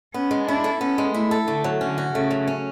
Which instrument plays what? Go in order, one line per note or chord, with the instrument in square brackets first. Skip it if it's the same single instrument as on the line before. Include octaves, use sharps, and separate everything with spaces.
[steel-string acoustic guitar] B3 [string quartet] C#4
[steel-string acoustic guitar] G#3
[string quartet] D4 [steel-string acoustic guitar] E4
[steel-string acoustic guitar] A4
[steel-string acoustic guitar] B3 [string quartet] C#4
[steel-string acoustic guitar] G#3
[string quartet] A3 [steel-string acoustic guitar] E4
[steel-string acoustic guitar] A4
[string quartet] D3 [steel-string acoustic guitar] A3
[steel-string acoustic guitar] F#3
[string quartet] D3 [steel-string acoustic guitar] C#4
[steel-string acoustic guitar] F#4
[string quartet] C#3 [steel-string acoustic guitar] A3
[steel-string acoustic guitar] F#3
C#4